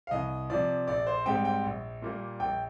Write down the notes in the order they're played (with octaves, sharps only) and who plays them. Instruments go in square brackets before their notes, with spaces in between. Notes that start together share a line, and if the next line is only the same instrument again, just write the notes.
[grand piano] F5
C2 D#5
C3 F3 D5
A#1 D5
C5
G#2 G3 C4 D#4 G5
G5
A#1
A#2 G3 A#3
A#1 G5